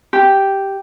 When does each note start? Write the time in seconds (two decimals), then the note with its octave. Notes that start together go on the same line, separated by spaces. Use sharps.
0.13 G4